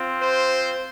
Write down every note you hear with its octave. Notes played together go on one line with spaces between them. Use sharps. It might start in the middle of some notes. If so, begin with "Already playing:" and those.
Already playing: C4 F4
C5